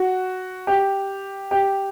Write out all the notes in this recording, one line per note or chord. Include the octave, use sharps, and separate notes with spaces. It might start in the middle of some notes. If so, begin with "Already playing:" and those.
Already playing: F#4
G4
G4